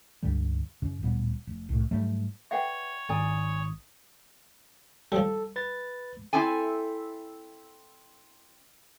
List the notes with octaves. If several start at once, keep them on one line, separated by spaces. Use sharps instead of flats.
C#2 G2 D3 G3
F#2 C#3
D1 A#2 G3 B3
F1
C2 A2
G#2 F#3 G3 A3
B4 C#5 D5 E5 F#5 G5
G#1 D5 G#5 A#5 D#6
F3 G3 A4
B4 A6
C4 E4 A4 G#5